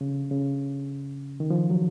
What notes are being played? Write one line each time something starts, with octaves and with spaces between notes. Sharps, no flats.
C#3
C#3
D#3
F3
F#3